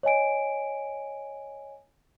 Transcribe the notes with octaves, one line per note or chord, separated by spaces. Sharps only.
C#5 D#5 G#5 D7